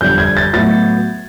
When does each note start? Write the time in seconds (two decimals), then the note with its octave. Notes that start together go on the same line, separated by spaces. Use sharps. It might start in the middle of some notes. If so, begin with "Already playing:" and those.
0.01 G1 F2 D3 G3 G6
0.18 G#6
0.37 A6
0.53 A2 F#3 B3 A6